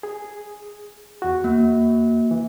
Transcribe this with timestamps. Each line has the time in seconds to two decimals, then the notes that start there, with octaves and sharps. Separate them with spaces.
0.03 G#4
1.22 E2 F#4
1.44 A#3
2.31 E3